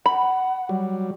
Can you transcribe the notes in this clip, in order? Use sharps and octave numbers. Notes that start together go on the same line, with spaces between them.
F#5 B5
F#3 G3